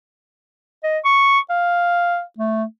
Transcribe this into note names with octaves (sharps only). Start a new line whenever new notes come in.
D#5
C#6
F5
A3